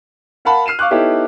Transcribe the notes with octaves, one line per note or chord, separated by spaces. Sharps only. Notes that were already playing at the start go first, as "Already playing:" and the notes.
A#4 F5 F#5 A5 B5
F6 C7 D#7 E7
F5 C#6 D6 F#6
B3 D#4 E4 G4 A4 C#5